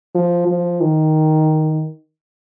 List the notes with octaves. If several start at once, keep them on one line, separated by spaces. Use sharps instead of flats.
F3
F3
D#3